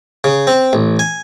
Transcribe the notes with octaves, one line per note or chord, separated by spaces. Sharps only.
C#3
C4
A1
G#5